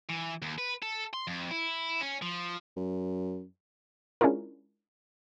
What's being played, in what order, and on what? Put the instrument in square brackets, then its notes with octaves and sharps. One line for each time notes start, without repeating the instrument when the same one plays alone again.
[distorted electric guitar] E3
D#2
B4
A4
C6
F2
E4
C#4
F3
[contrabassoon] F#2
[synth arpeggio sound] G#3 C#4 D4 E4 F4 A#4